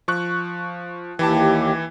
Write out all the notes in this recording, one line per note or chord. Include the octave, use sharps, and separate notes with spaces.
F3 C#6 F#6
D#2 E3 E4 G4 A5